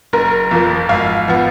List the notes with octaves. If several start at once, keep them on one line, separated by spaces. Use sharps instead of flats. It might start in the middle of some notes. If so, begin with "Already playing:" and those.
F#1 A#4
F2 F3 A#3
G#1 F5
F3 B3